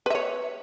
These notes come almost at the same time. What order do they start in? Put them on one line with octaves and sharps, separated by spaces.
B4 E5 C#5